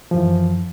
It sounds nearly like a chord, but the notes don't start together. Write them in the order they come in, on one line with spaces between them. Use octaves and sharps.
F3 F#2 E3